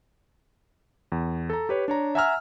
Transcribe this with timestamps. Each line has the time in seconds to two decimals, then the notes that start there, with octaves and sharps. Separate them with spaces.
1.12 E2
1.50 A4 A#5
1.69 G4 B4 C#5
1.88 D4 C#5 A#5
2.15 E5 F#5 G#5 A#5 E6 F6